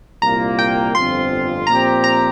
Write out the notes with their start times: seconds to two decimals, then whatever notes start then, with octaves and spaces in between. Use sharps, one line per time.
0.22 C2 A#2 A#3 F4 A#5
0.59 G5
0.94 G1 F2 F3 C4 F4 C6
1.67 A#2 F3 C4 G4 A#5
2.04 A#5